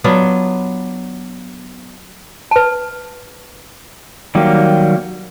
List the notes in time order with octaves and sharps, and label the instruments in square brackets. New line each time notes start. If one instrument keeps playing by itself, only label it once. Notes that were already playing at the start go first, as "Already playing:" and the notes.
[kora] F#3 B3 D4 F4
[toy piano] B4 A5
[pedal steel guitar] D#3 F#3 G3 A#3